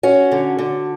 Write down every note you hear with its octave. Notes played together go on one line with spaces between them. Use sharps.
C#4 F#4
D3
D3